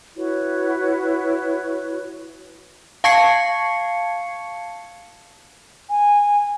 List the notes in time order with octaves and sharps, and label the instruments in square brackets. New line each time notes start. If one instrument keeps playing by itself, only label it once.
[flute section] E4 F#4 B4 C#5
[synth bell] F5 A5 C#6 G#6 C7 C#7
[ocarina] G#5